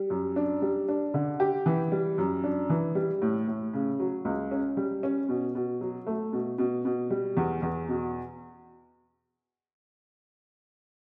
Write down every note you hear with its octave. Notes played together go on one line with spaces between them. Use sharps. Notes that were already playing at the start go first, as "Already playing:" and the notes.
Already playing: G3
F#2
D4
G3
D4
D3
G4
E3
G3
F#2
D4
E3
G3
A2
A2
C#3
F#3
C#2
C#4
G3
C#4
B2
B2
F#3
A3
B2
B2
B2
G3
E2
E2
B2